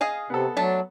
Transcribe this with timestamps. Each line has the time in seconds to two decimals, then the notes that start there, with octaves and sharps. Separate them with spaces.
0.01 G#4 D#5 F5 G#5
0.30 C3 B3 A4
0.57 F#3 A3 D4 A5